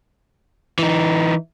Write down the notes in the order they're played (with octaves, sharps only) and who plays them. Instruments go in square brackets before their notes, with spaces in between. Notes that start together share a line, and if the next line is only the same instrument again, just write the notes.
[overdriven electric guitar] E3 D#4